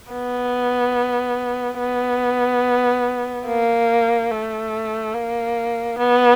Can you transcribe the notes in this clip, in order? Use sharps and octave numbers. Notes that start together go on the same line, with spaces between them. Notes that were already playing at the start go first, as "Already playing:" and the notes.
B3
B3
A#3
A3
A#3
B3